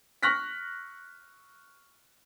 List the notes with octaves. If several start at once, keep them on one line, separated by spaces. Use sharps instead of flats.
C#6 F6 F#6 A#6 B6